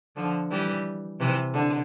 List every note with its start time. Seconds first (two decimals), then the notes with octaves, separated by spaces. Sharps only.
0.16 D3 F3
0.50 E3 G3
1.20 C3 E3
1.53 D3